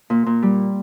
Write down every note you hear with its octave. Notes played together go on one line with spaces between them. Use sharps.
A#2
A#2
G3